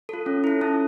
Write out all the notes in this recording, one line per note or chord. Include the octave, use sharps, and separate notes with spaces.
F4 A4
C#4
E4 A4
C#4 A5